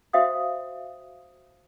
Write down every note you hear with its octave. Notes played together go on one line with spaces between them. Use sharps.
F#4 C5 E5 F5 G5 D#6